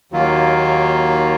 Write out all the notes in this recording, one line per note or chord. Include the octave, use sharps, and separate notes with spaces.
D#2 D#3 F#3 A#3 F4